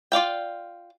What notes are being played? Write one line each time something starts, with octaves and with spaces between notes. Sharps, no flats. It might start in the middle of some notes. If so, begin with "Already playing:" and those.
F4 D5 F5 G5